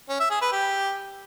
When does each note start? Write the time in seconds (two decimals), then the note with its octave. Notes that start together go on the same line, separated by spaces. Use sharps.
0.09 C#4
0.20 E5
0.31 G#4
0.41 B4
0.52 G4